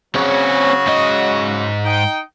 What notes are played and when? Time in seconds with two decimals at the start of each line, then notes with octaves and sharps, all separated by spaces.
0.15 C#3 F#3 C4 F#4 C#5
0.87 G#2 D#5
1.85 D#4 G5